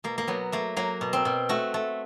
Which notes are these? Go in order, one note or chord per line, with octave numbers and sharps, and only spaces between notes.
B2 A#3
A#3
F#3 B3
A3 A#3
F#3 A#3
B2
C4
B2
A3 F#4
A3